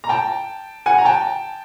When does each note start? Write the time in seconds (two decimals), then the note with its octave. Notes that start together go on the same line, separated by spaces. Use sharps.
0.04 A#5
0.09 G5 A5
0.86 F#5 G#5
0.98 A#5
1.05 G5 A5